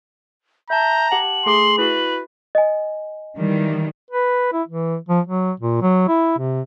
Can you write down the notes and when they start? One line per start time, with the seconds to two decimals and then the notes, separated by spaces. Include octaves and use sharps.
0.70 E5 A5 A#5 G6
1.11 G4 F#5 A5 F#7
1.46 A3 G#4 C6 D6
1.78 E4 F#4 B4
2.55 D#5 G#5
3.38 D#3 E3 G3
4.11 B4
4.53 E4
4.68 E3
5.09 F3
5.27 F#3
5.60 A#2
5.82 F#3
6.08 E4
6.38 C3